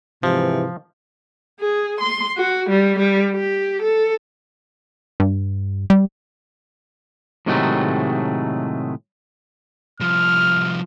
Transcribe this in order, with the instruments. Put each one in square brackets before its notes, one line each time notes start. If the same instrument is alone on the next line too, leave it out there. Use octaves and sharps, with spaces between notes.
[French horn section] G#2 E3 [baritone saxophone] C3 [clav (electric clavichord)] F3
[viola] G#4
C6
F#4
G3
G3
G4
A4
[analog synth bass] G2
G3
[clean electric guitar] A2 C3 D#3 F#3 G#3 A3
[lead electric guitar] C2 F3 [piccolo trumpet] F6